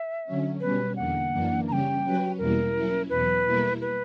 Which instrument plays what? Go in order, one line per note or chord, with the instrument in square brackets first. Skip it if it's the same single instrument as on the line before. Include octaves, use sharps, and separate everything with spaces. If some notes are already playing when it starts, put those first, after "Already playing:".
Already playing: [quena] E5
[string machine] D3 F#3 C#4
[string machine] B2 G3 C#4 [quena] B4
[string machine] E2 D3 A#3 [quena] F#5
[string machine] F#2 E3 A#3 D4
[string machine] C#3 G3 C#4 G4 [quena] G5 A#5
[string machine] F#3 C#4 F#4 B4
[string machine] E2 B2 G3 A#3 E4 [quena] A#4
[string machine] F#3 C#4 E4
[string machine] E2 B2 F#3 [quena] B4
[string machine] B2 G3 A#3 E4 A#4
[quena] B4